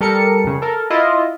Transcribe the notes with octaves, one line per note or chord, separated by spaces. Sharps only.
G3 A4 A#4 C#7
F2 C#3
A4 A#4
E4 F4 D#5